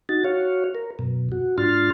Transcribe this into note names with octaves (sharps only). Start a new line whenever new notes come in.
D#4 F#4 A6
F#4 C#5 F5
A#4
F#2 B2
F#4
G#2 D4 F4 C6 F6 A6